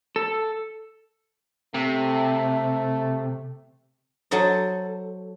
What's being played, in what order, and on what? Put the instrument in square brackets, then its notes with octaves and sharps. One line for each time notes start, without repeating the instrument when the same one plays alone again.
[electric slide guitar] A4
[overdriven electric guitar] C3 [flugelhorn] A3
[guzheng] F#3 A4 C5 D#5